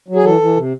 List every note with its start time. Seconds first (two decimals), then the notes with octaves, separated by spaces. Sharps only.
0.08 F#3
0.16 G#4
0.24 E3 A4
0.41 E3
0.56 C3